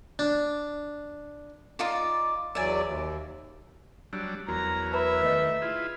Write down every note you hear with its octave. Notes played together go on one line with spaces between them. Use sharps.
D4
D#4 F4 D5
E2 F#3 D5 E5 G#5
D#2
F#3 G3 D4 E6
E2 F#3 F#4 A#4 A#5
B4 E5 A#5 B5
D#3 A3 B4 D#5
E4 F4 G#4